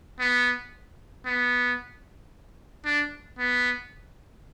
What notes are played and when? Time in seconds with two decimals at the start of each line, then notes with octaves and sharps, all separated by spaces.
0.19 B3
1.26 B3
2.85 D4
3.39 B3